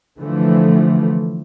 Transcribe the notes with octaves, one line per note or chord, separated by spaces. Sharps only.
D3 E3 F3 A3